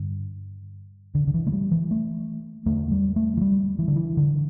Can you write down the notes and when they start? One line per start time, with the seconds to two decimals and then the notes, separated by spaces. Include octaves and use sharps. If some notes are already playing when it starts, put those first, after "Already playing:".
Already playing: G2 D3
1.15 D3
1.27 D3
1.34 E3
1.47 A3
1.52 G3
1.71 E3
1.91 A3
2.66 E2 D3 A3
2.91 G3
3.16 A3
3.37 E3
3.41 G3
3.79 E3
3.88 D3
3.96 E3
4.17 D3